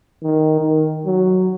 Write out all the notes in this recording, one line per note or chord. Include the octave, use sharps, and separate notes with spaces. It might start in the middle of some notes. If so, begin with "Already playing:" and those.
D#3
D#3
F#3